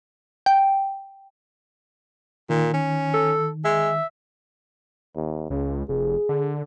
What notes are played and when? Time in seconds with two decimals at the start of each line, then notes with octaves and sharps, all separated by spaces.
0.46 G5
2.50 A#2 D#3
2.74 C#4
3.14 A4
3.65 G#3 E5
5.16 D#2
5.50 C#2 C#3
5.89 F1 G#4
6.29 D3